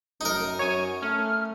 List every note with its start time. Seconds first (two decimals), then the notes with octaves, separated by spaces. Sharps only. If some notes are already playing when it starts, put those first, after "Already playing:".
0.21 F#2 D#4 A#4
0.59 F#2 C#5 G#5
1.02 A3 C#4 F6